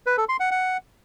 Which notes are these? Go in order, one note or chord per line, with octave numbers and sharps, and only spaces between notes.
B4
A4
C6
F#5
F#5